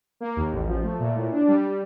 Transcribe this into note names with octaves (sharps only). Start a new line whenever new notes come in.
A#3
D#2
A1
F3
A3
A#2
A2
D4
G3